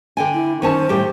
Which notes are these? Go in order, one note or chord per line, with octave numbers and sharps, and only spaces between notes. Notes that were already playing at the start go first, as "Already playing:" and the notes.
D3 G5 G#5
E4
D#3 C#4 C5 A5
A2 G3 G4